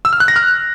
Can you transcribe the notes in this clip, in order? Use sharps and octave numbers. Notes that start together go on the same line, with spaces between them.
E6
F6
F#6
A#6
F6